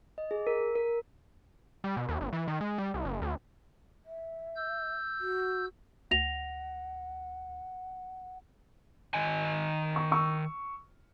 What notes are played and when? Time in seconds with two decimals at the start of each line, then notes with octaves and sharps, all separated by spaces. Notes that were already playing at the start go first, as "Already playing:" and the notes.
0.18 D#5
0.31 G#4
0.47 A#4
0.75 A#4
1.84 G3
1.97 B2
2.09 D#2
2.21 G1
2.33 E3
2.48 D#3
2.61 G#3
2.78 G3
2.94 C2
3.05 F#1
3.22 D2
4.06 E5
4.56 E6 G6
5.20 F#4
6.11 D2 F#5 A#6 F7
9.14 D#3 D#5 G#5
9.96 C#6
10.11 C#6 E6